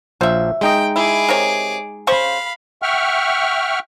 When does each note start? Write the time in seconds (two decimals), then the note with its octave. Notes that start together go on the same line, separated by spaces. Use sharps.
0.21 A#1 F#3 F4 C5 E5
0.61 G#3 D#4 D#5 G5
0.96 E4 G#4 D6
1.29 C3 A#4 C#5
2.07 C#3 C5 F5 B5 C#6
2.82 E5 F#5 G5 C#6 F6